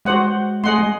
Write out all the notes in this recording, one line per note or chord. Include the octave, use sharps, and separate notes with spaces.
G#3 F#4 C5 F#5
A3 G#4 D#5 F#5 C6
G#3